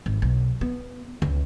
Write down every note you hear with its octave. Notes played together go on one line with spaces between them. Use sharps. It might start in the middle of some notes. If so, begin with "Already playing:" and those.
G#1
B1
B3
C#2